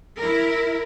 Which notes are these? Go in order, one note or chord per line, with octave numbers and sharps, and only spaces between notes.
E4 A#4